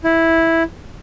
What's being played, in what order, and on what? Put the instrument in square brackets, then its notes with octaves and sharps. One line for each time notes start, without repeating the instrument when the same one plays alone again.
[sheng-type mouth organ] E4